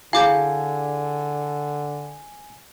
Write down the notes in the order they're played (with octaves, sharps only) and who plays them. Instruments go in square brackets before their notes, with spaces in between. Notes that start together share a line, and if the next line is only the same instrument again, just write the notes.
[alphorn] D3 [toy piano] E4 F#4 G#4 [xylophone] F5 D6 G6 [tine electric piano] G#5